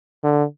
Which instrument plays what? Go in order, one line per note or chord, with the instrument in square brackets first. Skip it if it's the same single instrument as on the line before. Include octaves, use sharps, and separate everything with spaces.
[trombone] D3